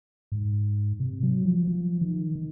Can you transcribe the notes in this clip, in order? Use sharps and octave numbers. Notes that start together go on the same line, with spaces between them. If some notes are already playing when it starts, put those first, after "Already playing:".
G#2
C3
F#3
F3
F3
D#3
D#3